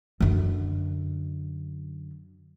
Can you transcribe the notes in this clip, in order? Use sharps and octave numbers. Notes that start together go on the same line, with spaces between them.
F#2 D3